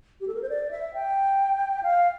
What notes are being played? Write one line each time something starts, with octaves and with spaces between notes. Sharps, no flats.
G4
A4
A#4
C5
D5
E5
G5
F5